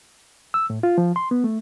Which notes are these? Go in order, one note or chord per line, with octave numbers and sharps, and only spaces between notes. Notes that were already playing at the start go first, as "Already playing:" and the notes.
E6
A2
F4
F3
C6
B3
A3